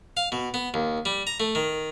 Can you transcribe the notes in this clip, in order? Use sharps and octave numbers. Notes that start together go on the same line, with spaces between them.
F5
B2
B3
D#2
G3
A#5
A3
D#3